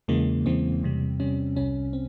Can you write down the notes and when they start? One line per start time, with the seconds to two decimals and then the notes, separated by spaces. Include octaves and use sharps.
0.08 E2 C#3 E3 G#3 A#3
0.45 E2 C#3 E3 G#3 C4
0.83 E2 C3 G3
1.20 E2 C3 G3 C#4
1.56 C2 C3 G3 C#4
1.93 C4